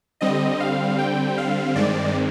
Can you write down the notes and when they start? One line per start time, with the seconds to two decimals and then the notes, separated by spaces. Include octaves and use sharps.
0.21 D3 G3 C4 D#5
0.60 F5
0.99 G5
1.38 F5
1.75 G2 D#3 G#3 C4 D5